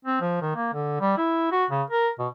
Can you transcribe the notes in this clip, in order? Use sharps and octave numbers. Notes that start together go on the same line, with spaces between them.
C4
F3
D#3
A#3
D3
G3
E4
F#4
C#3
A#4
B2